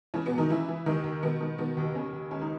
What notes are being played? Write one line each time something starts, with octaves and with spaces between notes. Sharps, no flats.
C#3 E3 C#4
B2 B3
F#2
D#3 D#4
C#3 E3 E4
E3
D#2 D#3 D#4
D#2
B2 D#3 B3
D#3
B2 D#3 B3
D#2
B3
D#2 C#3 C#4
D#2
C#2 C#4
D#4